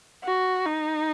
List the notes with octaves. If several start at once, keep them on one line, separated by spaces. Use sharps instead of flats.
F#4
D#4